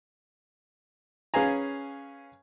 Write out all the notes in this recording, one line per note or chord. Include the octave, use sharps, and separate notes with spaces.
C#4 G#4 B4 F5 G#5 A#5